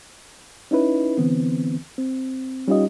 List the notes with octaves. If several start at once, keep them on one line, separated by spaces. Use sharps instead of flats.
C#4 D#4 E4 B4
D3 E3 B3 C4
C4
G3 C#4 D#4 F4 G4 D#5